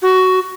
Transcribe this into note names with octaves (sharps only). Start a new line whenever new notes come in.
F#4